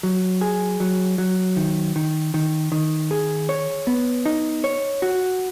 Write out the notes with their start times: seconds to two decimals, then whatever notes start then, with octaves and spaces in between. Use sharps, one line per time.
0.03 F#3
0.41 G#4
0.80 F#3
1.18 F#3
1.57 D#3
1.96 D#3
2.34 D#3
2.72 D#3
3.11 G#4
3.49 C#5
3.87 B3
4.26 D#4
4.64 C#5
5.02 F#4